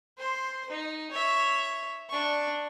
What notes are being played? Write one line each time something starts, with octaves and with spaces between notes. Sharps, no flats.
C5 C6
D#4
C#5 E5
D4 C#6